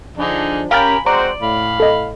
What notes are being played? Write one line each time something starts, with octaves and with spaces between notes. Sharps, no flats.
D3 F3 D4 D#4 G#4
C#4 G4 A#4 F5 G#5 B5 F6 A6
G#3 C4 F#4 C5 D5 A#5
A2 F5 B5
A4 D#5